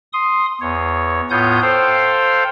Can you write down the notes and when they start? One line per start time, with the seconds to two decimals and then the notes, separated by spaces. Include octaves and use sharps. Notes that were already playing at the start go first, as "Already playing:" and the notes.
0.13 C6 D#6
0.61 E2 C#5
1.30 A2 B3 F4 C#5 D#6 G6
1.62 A4 C5 F5 G5